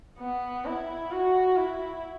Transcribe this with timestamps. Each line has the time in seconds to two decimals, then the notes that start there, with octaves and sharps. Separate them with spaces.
0.19 B3
0.66 E4
1.11 F#4
1.57 E4